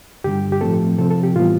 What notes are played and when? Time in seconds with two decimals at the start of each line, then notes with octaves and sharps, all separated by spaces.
0.24 G2 D3 G3 G4
0.52 G4
0.61 A2 F3 A3 C4 A4
0.98 C3 F3 C4 A4
1.10 A4
1.23 G4
1.35 A2 E3 G3 B3 F4